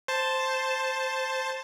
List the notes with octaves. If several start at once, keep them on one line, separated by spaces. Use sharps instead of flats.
C5 A5